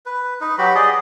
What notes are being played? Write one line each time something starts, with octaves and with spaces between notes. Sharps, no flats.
B4
D#4 B4
F#3 F#4 G4 B5
G#4 D5 D#5